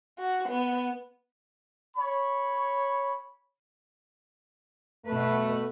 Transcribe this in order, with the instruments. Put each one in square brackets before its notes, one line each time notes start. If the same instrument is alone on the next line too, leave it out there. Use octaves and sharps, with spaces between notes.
[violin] F#4
B3
[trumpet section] C#5 B5
[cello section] B2 B4 [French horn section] A3